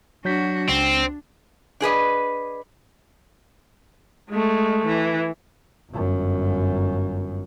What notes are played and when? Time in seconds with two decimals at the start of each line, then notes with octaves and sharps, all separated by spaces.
0.25 F#3 D4 F#4 G6 B6
0.69 C#2 C4 D4
1.80 D4 G#4 B4 D#5
4.30 G#3 A3
4.86 E3
5.91 G1 F#2